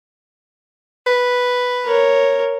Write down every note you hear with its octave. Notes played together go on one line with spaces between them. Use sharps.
B4
A#4 C#5